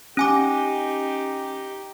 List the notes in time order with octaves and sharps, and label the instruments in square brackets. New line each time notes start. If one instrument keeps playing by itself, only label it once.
[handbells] C#4 G#5 D6 [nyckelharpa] D#4 G4